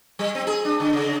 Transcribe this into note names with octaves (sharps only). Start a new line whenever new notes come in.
G3
C4
G#4
D4
D3
C#3